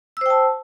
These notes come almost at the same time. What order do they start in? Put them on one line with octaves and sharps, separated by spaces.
E6 C5 G5 A5